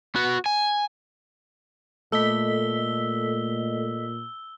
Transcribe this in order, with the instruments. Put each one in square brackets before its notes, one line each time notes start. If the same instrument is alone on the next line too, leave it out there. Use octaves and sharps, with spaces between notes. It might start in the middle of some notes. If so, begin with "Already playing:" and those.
[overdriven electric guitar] B3 F#4
G#5
[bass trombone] A#2 [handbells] A3 [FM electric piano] A4 D#5 B6 [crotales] E6 G7